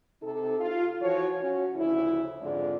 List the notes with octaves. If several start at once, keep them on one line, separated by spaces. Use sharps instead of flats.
C3 D#4 A4
F4
E3 F3 F#4 C#5
C#4 F#4
D2 C#3 F3 E4
F2 G#2 D3 G#3 F4 D5